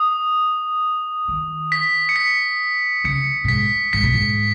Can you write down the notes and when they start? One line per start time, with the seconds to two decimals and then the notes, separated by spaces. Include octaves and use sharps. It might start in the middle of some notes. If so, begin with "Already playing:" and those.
Already playing: D#6
1.28 D#3
1.72 B6
2.09 C#7
2.16 B6
3.04 C#3 C#7
3.44 B2
3.48 G#2 B6
3.93 G#2 B6
4.03 B2
4.14 G#2